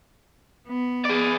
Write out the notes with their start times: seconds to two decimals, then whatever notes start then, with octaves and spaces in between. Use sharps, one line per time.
0.68 B3
1.05 G#4 D5